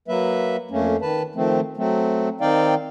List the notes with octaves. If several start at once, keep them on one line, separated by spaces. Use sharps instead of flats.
F#3 A#3 B4 E5
F2 A3 A#3 C#4
D#3 B4 A5
D#3 F3 A3 C4
F#3 A3 C4
D#3 C4 D#4 D5 F5 G5